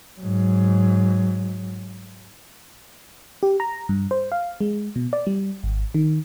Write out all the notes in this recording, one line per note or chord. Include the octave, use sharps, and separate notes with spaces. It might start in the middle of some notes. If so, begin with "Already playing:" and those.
G#2 F#3
G4
A#5
G2
C5
F5
G#3
B2
D5
G3
G#1
D#3